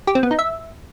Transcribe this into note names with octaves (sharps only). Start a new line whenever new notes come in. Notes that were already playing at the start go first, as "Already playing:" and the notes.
G4
C4
B3
D#4
E5